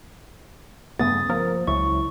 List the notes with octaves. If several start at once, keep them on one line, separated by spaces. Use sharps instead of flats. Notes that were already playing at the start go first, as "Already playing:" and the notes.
G2 C#3 A3 B3 D#6 A6
F3 A#3 A#4
C#2 F#3 E4 C#6